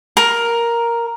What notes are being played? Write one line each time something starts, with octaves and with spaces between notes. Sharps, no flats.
A#4